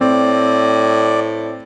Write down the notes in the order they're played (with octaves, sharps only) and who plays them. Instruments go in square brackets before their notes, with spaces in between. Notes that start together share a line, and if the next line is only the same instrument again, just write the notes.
[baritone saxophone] A2 [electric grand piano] C4 [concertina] D5